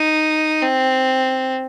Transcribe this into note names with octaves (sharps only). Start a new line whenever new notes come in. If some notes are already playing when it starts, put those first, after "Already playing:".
Already playing: D#4
C4